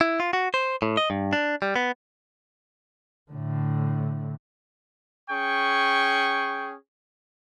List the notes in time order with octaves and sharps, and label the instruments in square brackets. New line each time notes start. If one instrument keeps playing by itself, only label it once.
[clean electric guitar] E4
F4
F#4
C5
A2
D#5
G2
D4
G3
B3
[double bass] A2 D3
[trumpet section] C#4 G#4 G5 C#6